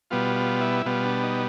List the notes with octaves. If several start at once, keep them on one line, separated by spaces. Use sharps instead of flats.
B2 G3 B3 F4
F4
E4
B2 G3 B3 F4
D4
D#4